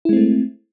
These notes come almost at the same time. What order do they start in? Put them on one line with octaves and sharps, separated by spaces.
E4 G#3 C4 A3